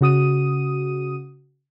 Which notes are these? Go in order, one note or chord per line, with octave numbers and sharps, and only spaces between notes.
C#3 F#4 D#6 D#7